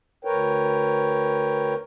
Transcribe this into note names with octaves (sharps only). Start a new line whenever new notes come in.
D2 A#4 B4 C#5 G5